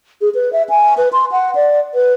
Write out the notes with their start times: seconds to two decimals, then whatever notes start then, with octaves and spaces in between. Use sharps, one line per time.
0.21 G#4
0.35 B4
0.53 E5
0.70 G#5
0.97 B4
1.13 C6
1.32 F#5
1.55 D5
1.95 B4